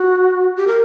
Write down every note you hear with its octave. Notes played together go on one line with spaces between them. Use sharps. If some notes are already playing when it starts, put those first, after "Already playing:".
Already playing: F#4
G4
A#4